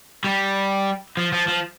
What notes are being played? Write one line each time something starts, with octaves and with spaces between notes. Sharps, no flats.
G3
F3
F3
F3